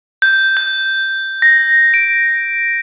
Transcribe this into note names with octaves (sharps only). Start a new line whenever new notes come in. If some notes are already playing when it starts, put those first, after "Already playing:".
G6
G6
A#6
D7